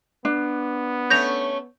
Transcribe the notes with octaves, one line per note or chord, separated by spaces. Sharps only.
B3 D4
A3 C#4 C#5 G6 A#6 F7